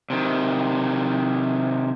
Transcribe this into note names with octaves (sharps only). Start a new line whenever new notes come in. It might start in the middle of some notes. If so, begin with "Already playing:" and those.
C3 D#3